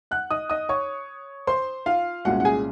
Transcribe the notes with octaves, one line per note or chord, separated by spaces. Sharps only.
F#5 F#6
D#5 D#6
D#5 D#6
C#5 C#6
C5 C6
F4 F5
C2 A#2 G#3 C#4 F#4 F#5
F#5
G#4 G#5